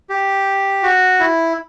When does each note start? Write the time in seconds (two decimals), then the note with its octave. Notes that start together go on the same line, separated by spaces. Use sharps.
0.10 G4
0.83 F#4
1.20 E4